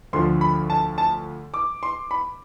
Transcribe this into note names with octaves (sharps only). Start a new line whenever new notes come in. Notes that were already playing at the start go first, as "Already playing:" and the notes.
D2 D3 F3 C6
B5
A5
A5
D6
C6
B5